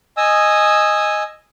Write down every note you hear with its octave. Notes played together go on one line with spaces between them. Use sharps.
D#5 G#5 D#6 E6